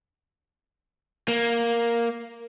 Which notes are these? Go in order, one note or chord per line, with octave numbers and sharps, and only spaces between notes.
A#3